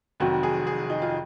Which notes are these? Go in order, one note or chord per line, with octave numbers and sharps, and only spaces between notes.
F1 F2 D#3 F#3 F#4
G#4
G#4
D#4
F4